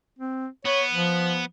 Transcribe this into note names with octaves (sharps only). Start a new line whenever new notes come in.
C4
B3 C#5
F3